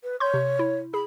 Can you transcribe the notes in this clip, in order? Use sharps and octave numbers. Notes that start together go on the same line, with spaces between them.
B4
C#5 C6 C#6 G6
C3
E4
G#4 B5